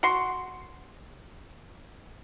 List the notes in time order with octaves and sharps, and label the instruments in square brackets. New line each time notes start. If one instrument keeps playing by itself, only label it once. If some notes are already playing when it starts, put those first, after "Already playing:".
[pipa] F#4 C6